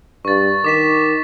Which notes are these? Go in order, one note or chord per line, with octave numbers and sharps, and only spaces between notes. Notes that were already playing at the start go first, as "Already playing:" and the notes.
G2 C#6 A6
D#3 D6 B6 E7